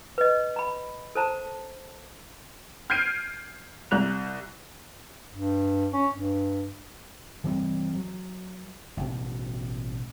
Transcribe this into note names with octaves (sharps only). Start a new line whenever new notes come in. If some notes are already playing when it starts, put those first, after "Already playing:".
B4 D#5
A#5 B5
A4 C5 A5 A#5
F6 G6 G#6 C7 D7 D#7
C2 F#6 F7
G2
C#4
G2
E3 G3 C4
F#3
A1 B2